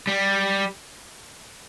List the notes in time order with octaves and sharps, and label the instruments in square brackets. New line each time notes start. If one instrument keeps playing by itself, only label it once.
[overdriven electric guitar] G3